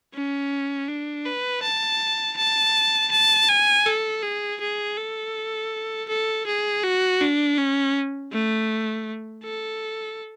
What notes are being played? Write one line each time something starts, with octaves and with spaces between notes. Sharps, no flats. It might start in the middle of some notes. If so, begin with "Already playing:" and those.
C#4
D4
B4
A5
A5
A5
G#5
A4
G#4
G#4
A4
A4
G#4
F#4
D4
C#4
A3
A4